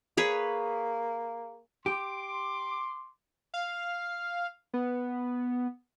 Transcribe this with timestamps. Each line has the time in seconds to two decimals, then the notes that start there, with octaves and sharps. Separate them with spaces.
0.17 A#3 G#4 B4 C#5
1.86 G4 C6 D6
3.54 F5
4.74 B3